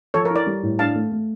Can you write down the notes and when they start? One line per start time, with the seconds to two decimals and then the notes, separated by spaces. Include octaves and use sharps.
0.14 F3 A4 C#5
0.25 A#4
0.30 E4
0.36 A#4 D5
0.46 G3
0.63 A2
0.79 D4 F5 A5
0.95 A3
1.12 A3